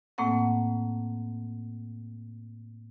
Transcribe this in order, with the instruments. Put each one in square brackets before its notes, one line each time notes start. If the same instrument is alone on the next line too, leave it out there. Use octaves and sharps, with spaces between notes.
[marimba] A2 A3 A#3 C4 F#5